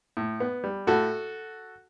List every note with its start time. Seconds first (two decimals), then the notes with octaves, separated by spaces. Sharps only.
0.17 A2
0.40 B3
0.64 G3
0.87 A2 F#4 A4